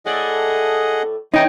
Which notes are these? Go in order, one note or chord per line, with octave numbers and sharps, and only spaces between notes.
A2 A3 G#4 D5 D#5 F#5
C3 E3 D#4 C#5 D#5 G5